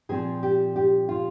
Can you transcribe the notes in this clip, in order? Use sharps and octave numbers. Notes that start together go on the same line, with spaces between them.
A#2 F3 C4 G#4
G4
G4
F4